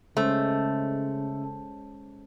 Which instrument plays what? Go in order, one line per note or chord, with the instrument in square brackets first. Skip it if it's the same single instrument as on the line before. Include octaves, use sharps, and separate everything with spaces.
[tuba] C#3 [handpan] G#3 C#4 C5 [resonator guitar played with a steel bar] A3